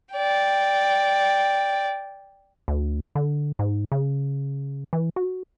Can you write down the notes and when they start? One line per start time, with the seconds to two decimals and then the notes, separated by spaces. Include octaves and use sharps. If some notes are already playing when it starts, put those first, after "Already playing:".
0.13 D5 G5
2.68 D2
3.15 D3
3.59 G#2
3.92 C#3
4.93 E3
5.16 F#4